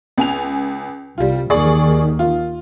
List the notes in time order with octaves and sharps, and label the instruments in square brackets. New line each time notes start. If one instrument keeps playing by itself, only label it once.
[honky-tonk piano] C#2 G#5 F7
[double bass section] C2 [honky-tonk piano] G3 F4
[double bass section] D#2 D#3 [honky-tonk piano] G#4 D5 C#6
[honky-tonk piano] F4